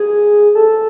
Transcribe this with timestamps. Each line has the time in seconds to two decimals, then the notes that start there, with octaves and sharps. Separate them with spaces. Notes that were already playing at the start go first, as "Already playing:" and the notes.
Already playing: G#4
0.55 A4